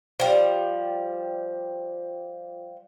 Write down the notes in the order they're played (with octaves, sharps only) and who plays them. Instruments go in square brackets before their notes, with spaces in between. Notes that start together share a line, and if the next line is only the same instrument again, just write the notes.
[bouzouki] F3 G3